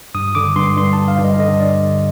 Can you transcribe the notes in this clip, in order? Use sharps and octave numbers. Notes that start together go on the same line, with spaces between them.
G2 D#6
D3 D6
G2 C6
G2 C6
A5
G2
F5
G2
D#5
D3 D#5
D5